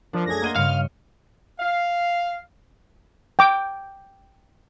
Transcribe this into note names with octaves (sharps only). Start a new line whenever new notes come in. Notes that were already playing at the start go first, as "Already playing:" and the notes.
F3 D4 A#4
F#2 A3 G#4 G#6 A#6
A#3 D#5 F#5 C6 D#7 G7
G2 C#3 F5 F6 C#7
F5
G5 D6